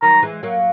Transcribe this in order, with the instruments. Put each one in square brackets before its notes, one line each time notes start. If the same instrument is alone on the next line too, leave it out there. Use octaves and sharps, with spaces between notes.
[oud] D#3 F#3 [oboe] A#5
[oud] E3 G#3
F#3 A#3